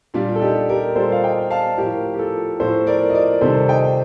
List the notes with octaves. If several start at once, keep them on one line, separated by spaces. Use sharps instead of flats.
A#2 G3 D4 F4
A4
D#4 G4
G4 A#4
A#2 G3 A4 C5
F5
D#5 G5
F5 A5
A2 F3 G4 A#4
G4
F4 A4
A2 F3 A4 C5
A#4 D5
D#5
A#4 D5
C3 D#3 G3 A4 C5
D#5 G5